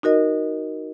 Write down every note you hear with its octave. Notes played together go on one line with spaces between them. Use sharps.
D#4 F#4 A#4 D#5